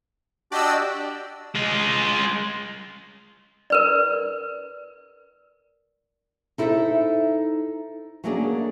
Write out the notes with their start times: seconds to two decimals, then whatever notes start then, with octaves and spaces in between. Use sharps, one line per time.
0.52 D4 F#4 G4 D5 D#5 E6
1.55 G#3 F4
3.70 A#4 B4 D5
6.58 D#4 E4 A4 B4 C5 E5
8.24 F#3 A3 A#3 C#4 D4 G#4